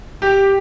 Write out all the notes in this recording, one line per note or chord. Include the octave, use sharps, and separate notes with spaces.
G4